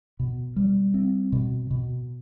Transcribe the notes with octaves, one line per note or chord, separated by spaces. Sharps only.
B2
G3
C4
B2
B2